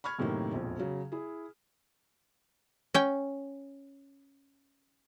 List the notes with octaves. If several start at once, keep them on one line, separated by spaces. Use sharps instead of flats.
B5 C#6 F6 G#6
F#2 A2 C3 D#3 A#3
E1 A#1 F2
C#3 F#3
E4 G#4
C#4 G5